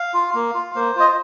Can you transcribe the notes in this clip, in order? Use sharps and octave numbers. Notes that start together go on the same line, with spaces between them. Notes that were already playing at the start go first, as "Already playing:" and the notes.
Already playing: F5
F4
A#3
F4
A#3 C5
F4 D#5
C5